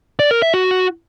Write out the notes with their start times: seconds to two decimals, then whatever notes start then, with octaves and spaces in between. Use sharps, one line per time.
0.19 D5
0.31 A#4
0.42 E5
0.54 F#4